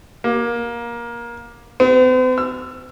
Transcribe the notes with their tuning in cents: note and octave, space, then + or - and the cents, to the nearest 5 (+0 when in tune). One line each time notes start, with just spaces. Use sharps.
A#3 +20
C4 -45
E6 +25